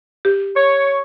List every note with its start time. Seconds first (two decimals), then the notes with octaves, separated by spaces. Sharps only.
0.25 G4
0.56 C#5